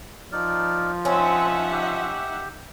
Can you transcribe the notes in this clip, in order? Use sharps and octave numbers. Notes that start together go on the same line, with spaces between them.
F3 D#4 A#4 D5
C4 C#4 D#4 E5 F#5
G4